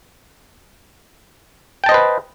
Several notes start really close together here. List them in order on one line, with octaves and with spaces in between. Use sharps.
G5 A5 D#5 C5 B4